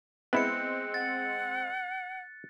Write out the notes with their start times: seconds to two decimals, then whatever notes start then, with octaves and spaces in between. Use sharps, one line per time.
0.33 G#3 B3 C4 E4 F#6 C#7
0.94 F#5 A6